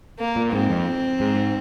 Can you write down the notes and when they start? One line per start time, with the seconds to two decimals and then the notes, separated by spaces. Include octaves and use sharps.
0.19 A#3
0.36 A#2
0.53 G#2 C4
0.70 F2
1.20 G#2